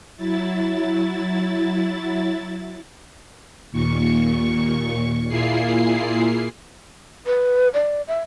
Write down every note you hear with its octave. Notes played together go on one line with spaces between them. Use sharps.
F#3 E4 A6
D#2 A#2 C#6
A#2 A#3 E4 F4 G#4 C7
B4
D5
E5